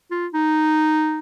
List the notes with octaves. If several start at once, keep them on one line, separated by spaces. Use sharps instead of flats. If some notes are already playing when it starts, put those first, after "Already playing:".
F4
D#4